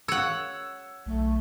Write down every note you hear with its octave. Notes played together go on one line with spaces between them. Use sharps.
C#5 F#5 E6
B1 A3